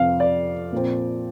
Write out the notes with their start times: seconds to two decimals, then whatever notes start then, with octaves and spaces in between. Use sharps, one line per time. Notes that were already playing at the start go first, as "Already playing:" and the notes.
Already playing: F2 C3 F3 F5
0.20 D5
0.72 A#2 F3 C4